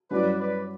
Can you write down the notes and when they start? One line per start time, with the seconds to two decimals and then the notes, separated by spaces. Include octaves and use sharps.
0.11 G2 F#3 C#4 E4 B4 D5
0.39 B4 D5